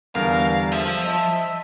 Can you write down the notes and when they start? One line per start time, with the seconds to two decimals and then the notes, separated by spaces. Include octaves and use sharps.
0.15 E2 D3 G3 A#4 F5
0.72 F3 E5
1.04 D#5 A5